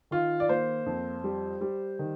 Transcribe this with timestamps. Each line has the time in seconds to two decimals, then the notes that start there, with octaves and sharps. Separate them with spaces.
0.11 D#3 F4
0.40 D5
0.49 A#3 C5
0.86 F2
1.24 G3
1.61 G3
1.99 D#3